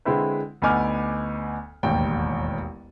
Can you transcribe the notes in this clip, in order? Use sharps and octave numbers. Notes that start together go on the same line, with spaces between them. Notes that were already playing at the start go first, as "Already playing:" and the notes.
D3 G#3 C4 E4 B4
D2 B3 D#4 G#5 D6 F6
E1 A1 D#2 G5